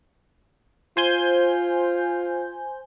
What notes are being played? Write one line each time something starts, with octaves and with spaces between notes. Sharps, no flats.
F4 C5 G#5 G6